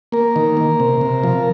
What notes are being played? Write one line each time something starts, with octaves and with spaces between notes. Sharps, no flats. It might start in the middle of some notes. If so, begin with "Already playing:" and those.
A#3 A#4
D#3
A#3
C3
C3
F3